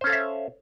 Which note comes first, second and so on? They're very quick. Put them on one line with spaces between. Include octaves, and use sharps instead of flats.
C5 C#4 A4 F5 E5